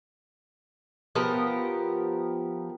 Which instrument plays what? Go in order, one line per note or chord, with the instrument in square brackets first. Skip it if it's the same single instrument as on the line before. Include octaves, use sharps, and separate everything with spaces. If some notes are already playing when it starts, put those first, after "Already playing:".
[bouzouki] F3 B3 G4 A#4